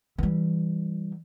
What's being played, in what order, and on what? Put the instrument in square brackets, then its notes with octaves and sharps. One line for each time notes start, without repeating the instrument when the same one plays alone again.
[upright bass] E3 G3